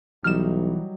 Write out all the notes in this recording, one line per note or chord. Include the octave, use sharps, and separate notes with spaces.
B1 E3 F#3 G3 D#4 F6 E7